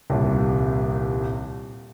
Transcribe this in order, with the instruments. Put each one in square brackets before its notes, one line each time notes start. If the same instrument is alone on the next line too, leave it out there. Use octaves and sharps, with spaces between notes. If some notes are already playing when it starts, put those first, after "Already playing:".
[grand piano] D#1 C2